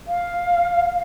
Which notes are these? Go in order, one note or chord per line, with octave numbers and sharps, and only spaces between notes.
F5